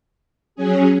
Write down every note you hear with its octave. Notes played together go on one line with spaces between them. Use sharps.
F#3 C#4 G#4